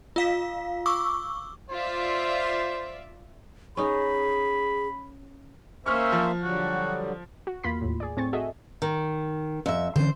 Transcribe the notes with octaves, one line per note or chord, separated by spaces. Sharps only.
F4 F5 B6
C#6 D6 E6
F4 C5 D5 E5
C#4 D#4 G#4 B5
A#3 C#4 C5 E5 C#6 F6
F3
D3 F#3 G3 F#4
F#4
E2 A#3 F4 B5 C6 B6
D#2 A2
G#4 D5
A2 C4 G#5 C#6 A6
F#4 G#4 A4 D#5 E5
D#3
F2 E5
D3 E3 C#4 C5